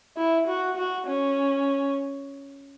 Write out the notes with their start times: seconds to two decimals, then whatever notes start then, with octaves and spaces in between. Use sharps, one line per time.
0.17 E4
0.48 F#4
0.77 F#4
1.07 C#4